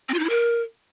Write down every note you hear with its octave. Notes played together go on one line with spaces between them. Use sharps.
C4
F4
D#4
E4
A#4